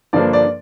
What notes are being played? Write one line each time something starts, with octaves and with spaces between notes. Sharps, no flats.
G2 D3 F3 A#3 D4 D5
D5